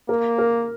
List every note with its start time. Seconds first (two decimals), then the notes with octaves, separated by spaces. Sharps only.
0.09 A#3 A#4
0.38 A#4